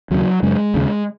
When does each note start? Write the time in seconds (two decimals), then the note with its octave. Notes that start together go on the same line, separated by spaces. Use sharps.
0.10 D#2 C#3 F#3
0.43 F#2 C#3 G#3
0.74 D#2 C#3